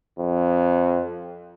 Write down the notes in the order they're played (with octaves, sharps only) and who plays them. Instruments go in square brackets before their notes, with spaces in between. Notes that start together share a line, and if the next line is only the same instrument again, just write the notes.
[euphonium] F2